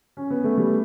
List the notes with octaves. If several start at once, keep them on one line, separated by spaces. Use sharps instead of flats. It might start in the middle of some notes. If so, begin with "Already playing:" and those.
C#4
B3
A3
G3